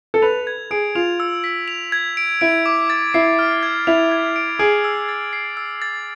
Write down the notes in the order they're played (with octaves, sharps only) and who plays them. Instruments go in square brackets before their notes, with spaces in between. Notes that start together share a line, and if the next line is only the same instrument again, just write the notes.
[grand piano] A4
[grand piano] B4 [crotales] F7
[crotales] G#6
[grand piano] G#4 [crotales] D7
[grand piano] F4 [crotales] F7
[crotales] E6
B6
F7
G#6
D7
[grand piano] E4 [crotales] D7
[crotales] D6
A6
[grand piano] E4 [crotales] C7
[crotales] F6
G#6
[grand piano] E4 [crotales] F7
[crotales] G#6
D7
[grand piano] G#4 [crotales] D7
[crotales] E6
A6
C7
E6
A6